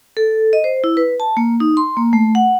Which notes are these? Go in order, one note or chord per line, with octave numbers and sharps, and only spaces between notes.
A4
D#5
C5
E4
B4
A5
A#3
D#4
C6
A#3
A3
F#5